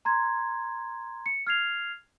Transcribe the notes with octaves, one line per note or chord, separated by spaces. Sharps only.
A#5 C6 G#6
C#7
F6 G#6 C7 F7